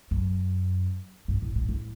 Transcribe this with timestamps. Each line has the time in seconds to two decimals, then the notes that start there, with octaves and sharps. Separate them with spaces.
0.11 F#2
1.28 G2
1.42 A2
1.55 A2
1.69 A2